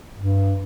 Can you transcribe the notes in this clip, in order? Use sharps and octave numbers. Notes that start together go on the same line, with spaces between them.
G2